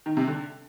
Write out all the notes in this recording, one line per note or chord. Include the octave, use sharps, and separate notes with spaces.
D#3
C3
D3